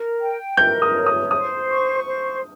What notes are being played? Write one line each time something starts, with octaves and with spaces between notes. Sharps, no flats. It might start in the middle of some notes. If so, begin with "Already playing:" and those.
Already playing: A#4
G5
A#4 G6
D#6
C#5
D#6
C5 D#6
C#6
C5